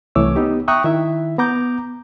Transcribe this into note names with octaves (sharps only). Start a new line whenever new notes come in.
C2 E3 A3 C#5 D6 E6
B3 D#4 G4
E5 G5 A#5 C#6 D#6 F#6
D#3 E4 E5
B3 A#5 D6 G6